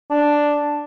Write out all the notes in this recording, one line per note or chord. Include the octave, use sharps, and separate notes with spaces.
D4